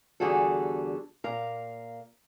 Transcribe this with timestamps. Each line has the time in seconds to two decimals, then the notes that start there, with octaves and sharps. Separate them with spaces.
0.20 E2 D3 G3 F#4 G#4 A4
1.24 A#2 A#4 F5 A#5